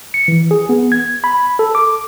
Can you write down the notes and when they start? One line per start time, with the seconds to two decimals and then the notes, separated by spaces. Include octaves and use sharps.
0.14 C#7
0.28 E3
0.51 G#4
0.69 B3
0.92 G#6
1.24 B5
1.59 A4
1.75 D6